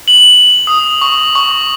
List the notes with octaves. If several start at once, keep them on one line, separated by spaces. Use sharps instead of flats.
F#7
D#6
C#6
C#6